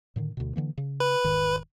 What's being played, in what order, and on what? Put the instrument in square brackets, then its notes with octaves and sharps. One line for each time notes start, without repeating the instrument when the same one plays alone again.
[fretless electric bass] A2 D3 D#3
D2 B2
D3 E3 A#3
C#3
[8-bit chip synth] B4
[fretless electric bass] E1 G#2 D#3